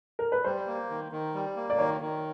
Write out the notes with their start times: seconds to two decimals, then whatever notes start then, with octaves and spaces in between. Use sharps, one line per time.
0.19 A#4
0.32 B4
0.44 G3 C5
0.67 A#3
0.90 D#3
1.12 D#3
1.35 G3
1.57 A#3
1.70 D5
1.78 D#3 C#5
2.01 D#3